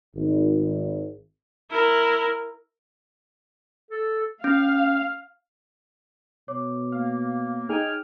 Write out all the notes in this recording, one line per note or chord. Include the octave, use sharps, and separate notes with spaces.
G#1
E4 A#4
A4
C#4 F5
B2 C#5 D6
A#3 F5
D#4 G#4 G5 G#5 F6